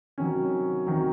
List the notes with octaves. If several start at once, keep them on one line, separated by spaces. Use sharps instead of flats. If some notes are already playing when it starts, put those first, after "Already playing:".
C3 D#3 F#3 C#4
C3 D#3 F#3